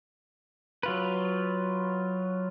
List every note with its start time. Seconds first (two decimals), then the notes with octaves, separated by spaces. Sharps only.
0.83 F#3 F4 B4